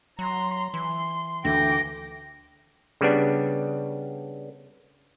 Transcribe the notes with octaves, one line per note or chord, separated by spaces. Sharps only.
F#3 A#5 C6
E3 C6
D2 E3 G5 D6 A#6
C#3 G3 B3 D4